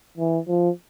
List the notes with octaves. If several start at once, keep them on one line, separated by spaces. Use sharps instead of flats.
E3
F3